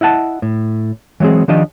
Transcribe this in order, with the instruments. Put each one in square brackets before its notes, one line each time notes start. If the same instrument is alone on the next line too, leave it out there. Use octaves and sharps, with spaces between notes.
[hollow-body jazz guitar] E4 D#5 F#5 A5
A2
E3 F#3 G#3 C4 G#4
D#3 F3 D4 G4 D#5